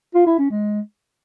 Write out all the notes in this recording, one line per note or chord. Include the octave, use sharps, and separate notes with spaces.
F4
E4
C#4
G#3